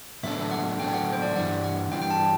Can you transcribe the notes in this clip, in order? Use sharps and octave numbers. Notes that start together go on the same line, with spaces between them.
A2 F#3 B3 D4 A4 E5
F#5
A2 F#3 B3 D4 A4 G5
F#5
C5
D5
G2 E3 G3 D4 F#5
F#5
G2 E3 G3 D4 G5
G5
A5